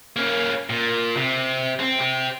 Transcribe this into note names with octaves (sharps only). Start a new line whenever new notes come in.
A#3 C#4
A#2
C3
C4
C4 G4